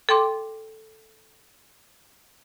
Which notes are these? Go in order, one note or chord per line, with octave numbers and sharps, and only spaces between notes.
A4 G5 C6 D6